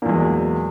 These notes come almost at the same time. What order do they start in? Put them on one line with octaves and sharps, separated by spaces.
A#2 E2 G#3 F#3